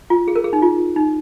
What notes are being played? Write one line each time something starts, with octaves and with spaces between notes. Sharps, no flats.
F4
G#4
A#4
G#4
D#4
F4
D#4